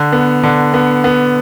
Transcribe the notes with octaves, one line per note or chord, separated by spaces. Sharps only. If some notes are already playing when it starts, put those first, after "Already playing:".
Already playing: D3
B3
D3
B3
B3